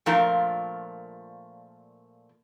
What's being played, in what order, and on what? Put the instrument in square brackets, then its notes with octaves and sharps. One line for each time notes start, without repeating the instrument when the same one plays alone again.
[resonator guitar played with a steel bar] A#2 F3 A3 D4 F4 A#4